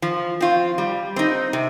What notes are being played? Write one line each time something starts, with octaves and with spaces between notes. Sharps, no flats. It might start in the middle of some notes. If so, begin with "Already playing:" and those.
F3
C4 F4
G3
C4 D#4
C3